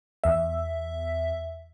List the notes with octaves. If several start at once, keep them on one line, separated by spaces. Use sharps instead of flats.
E2 E5